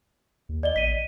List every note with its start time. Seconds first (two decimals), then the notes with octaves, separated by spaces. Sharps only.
0.49 D#2
0.63 D5 D#5 G7
0.76 A1 B6 D#7